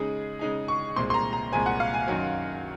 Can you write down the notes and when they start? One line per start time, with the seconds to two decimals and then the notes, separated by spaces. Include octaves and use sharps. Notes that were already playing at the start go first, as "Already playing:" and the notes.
Already playing: C#3 G#3 D#4 G#4
0.39 C#3 G#3 D#4 G#4
0.68 C#6
0.96 C2 A#2 G#3 C4 C6
1.10 C6
1.14 A#5
1.33 A#5
1.51 C2 A#2 G#3 C4 G#5
1.66 F#5
1.80 F5
1.94 G#5
2.08 F#2 D#3 F#3